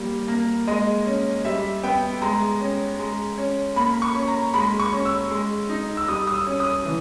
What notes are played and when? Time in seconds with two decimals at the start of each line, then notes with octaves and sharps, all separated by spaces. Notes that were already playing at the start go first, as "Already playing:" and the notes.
Already playing: G3 A#3
0.28 A#3
0.67 G#3 D#5
1.06 C#4
1.45 G3 E5
1.83 B3 G5
2.22 G#3 A#5
2.60 C#4
2.99 G#3
3.38 C#4
3.76 A#3 B5
4.02 C#6
4.14 C#4
4.28 A#5
4.54 G#3 B5
4.80 C#6
4.92 C#4
5.05 E6
5.31 G#3
5.69 D#4
5.97 E6
6.08 G3 D#6
6.27 D#6
6.34 E6
6.47 C#4
6.60 D#6
6.85 E3